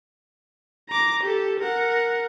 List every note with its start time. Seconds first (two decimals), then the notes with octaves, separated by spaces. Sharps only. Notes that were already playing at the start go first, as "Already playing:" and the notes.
0.89 A#5 D6
1.23 G4 A4
1.60 A#4 F#5